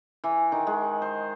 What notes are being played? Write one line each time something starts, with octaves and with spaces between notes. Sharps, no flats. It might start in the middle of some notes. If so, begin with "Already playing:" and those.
E3
D#3
G#3
C5